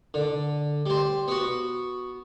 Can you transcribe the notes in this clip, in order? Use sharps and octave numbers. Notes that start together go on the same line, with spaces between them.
D3
G3 C5
B3 F#4